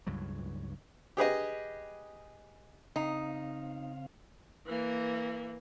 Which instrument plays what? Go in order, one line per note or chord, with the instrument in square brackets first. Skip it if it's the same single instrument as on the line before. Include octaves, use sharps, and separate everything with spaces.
[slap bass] C#2 G2 F#3
[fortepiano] G4 G#4 B4 D#5
[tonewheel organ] C#3 C4 F5 [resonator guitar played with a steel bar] D#4
[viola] E3 A#3